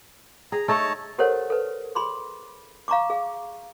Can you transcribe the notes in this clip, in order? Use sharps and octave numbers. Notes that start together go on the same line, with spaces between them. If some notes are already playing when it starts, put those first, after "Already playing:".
G#4 A#5
A3 D#4 C#5 A5 A#5
G4 A4 A#4 C5 C#5 F#5
A4 B4
G#4 B5 C6 D6
F5 A#5 C#6 D6
G#4 F5